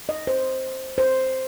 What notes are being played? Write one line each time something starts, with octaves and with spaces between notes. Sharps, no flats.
D#5
C5
C5